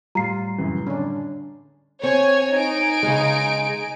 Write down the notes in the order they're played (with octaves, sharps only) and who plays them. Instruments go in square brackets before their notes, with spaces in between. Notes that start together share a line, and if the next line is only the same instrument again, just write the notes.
[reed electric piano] A2 G3 [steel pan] F4 [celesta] A#5 C7
[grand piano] F#2 C#3 E3
[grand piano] D3 [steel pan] C#4 D4
[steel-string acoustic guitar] C4 [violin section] C#5 G#5 G#6
[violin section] D#4 G#5 D7
[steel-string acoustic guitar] C#3 G#3